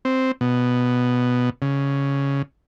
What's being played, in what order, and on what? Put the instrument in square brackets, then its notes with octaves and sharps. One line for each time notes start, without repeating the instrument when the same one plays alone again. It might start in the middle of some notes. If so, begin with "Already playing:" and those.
[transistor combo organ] C4
B2
C#3